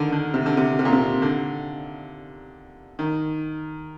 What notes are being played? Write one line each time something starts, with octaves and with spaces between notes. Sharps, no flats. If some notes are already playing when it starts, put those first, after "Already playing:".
Already playing: D3 D#3
D3
C3
D3
C3
C3
A#2
C3
D3
D#3